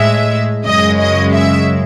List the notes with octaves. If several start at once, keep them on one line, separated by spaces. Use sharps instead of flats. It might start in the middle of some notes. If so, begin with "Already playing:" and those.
Already playing: A2 G#3 E5
F#2 C#3 G#3 D#5
D#5
E5